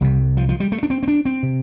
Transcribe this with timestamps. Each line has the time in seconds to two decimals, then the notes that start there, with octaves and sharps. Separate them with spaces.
0.01 C2 C3 G3
0.37 F3
0.49 F3
0.60 G3
0.72 A3
0.83 D4
0.90 C4
1.03 C4
1.08 D4
1.25 C4
1.43 C3